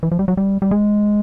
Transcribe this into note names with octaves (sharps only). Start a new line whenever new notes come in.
E3
F3
G3
F#3
G3
G3
G#3